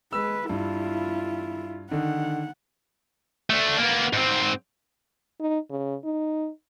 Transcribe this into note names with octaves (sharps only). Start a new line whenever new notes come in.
G#3 B4 E6
G2 E4 F4
D3 D#3 F#5
A3 D4
A#3 B3
G#2 C4
D#4
C#3
D#4